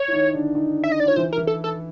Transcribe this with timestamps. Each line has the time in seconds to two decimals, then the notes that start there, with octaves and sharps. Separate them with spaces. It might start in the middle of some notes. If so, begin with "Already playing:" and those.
Already playing: C#5
0.08 E4
0.12 D#3 D#4
0.33 D3 D4
0.55 D#3 D#4
0.84 E5
0.92 D#5
1.00 D5
1.06 F4 C#5
1.16 E3 E4 C5
1.33 A#4
1.37 E3 E4
1.47 A4
1.64 A4